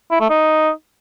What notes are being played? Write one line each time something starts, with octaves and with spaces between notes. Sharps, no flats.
E4
A3
D#4